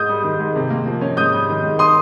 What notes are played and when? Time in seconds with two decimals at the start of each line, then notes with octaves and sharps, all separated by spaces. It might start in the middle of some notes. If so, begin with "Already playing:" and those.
Already playing: G#2 D#6 G6
0.09 G3
0.24 D#3
0.40 G#2
0.56 C3
0.70 A#3
0.87 F3
1.01 C#4
1.17 G#2 D#6 G6
1.33 G3
1.49 D#3
1.64 G#2
1.79 C6 D#6